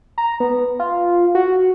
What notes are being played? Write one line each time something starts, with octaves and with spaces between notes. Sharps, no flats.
A#5
B3
F4
F#4